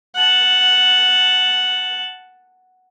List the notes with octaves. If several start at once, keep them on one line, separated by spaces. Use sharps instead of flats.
F#5 A5